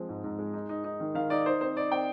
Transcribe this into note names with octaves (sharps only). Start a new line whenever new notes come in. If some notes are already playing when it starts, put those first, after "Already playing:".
Already playing: F3 G#3 C4
G#2
G#2
G#3
D#4
D#4
D#4
D#3
D#3 F5
D#4 D5
D#4 C5
C4 C5
D#4 D5
C4 G5